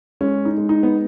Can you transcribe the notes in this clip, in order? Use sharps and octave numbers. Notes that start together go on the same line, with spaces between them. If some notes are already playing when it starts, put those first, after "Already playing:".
G#3 C#4
D#4
G#3
D#4
B3